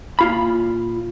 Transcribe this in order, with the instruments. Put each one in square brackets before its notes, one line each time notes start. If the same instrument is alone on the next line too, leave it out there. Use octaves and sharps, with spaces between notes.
[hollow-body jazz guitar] A#2 F4 B5